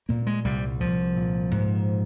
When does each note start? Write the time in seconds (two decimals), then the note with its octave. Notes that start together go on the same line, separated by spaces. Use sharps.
0.09 A#2 A#3
0.27 G#3
0.45 C2 G3
0.80 C2 F3
1.17 A#2
1.51 G#2